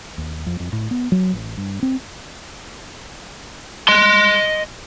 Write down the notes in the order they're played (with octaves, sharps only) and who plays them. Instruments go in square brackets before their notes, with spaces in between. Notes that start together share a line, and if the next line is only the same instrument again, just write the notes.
[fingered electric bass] D#2
F2
F2
A2
B3
F#3
A1
G2
C4
[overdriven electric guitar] D#5 C6